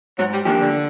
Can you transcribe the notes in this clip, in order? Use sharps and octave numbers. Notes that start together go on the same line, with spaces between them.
G#2 F#3
G3
D#3 F3 A#3 D4 G4
D3